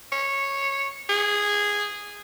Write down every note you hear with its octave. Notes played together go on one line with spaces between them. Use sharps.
C#5
G#4